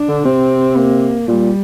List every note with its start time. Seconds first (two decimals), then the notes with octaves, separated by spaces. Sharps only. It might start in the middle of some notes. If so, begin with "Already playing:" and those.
Already playing: D4
0.08 D3
0.25 C3 C4
0.77 A#3
1.28 A#2 G3